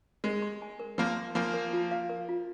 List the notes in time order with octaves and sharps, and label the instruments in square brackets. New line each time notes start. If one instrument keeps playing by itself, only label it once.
[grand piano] G#3 [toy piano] A#4
[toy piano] C6
G#5
A#4
[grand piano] F3 A#3 [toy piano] A#4
[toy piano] C6
[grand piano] F3 A#3 [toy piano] G#5
[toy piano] A#4
F4
F5
A#4
F4